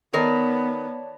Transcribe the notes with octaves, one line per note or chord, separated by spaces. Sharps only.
D#3 B3 A#4 B4 C#5 D5 A5